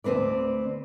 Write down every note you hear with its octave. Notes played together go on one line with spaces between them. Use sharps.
D2 A#2 C4 B4 D5